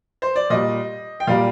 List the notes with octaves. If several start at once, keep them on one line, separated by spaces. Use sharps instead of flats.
C5
D5
A#2 G3 D#5
G5
A#2 G3 F5